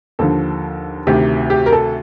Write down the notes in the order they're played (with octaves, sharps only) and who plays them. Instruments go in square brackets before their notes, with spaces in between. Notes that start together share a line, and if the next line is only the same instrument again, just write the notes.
[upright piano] D#2 D3 F3 A4
D2 C3 D#3 G4
G4
A#4
A4